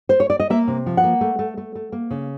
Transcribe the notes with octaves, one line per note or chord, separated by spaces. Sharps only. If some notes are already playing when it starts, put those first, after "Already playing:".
C5
C#5
D5
D#5
A#3 E5
C3
F3
F#5
A#3
A3
A3
A3
A3
A#3
C#3